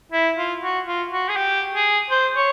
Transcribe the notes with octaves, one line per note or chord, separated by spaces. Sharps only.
E4
F4
F#4
F4
F#4
G#4
G4
G#4
C5
C#5